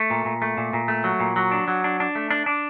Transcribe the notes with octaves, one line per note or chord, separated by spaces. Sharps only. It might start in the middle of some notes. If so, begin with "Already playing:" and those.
Already playing: A3
A#2
A#2
A3
A#2
A#2
A3
F#3
A#2
F#3
D4
F#3
D4
D4
A3
D4
D4